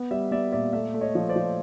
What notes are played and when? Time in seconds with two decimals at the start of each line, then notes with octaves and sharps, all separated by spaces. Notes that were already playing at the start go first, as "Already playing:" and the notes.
Already playing: B3
0.11 G3 D5 E5
0.31 B3 D5 E5
0.52 A#2 D5 E5
0.73 A3 D5 E5
0.94 A3
1.01 C#5 D#5
1.15 F3
1.29 C5 D5
1.36 F3